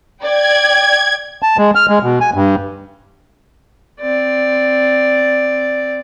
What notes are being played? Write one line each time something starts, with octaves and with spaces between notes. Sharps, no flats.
D5 G5 G#6
A5
G#3
F6
G#3
B2
G#5
G2
C4 D5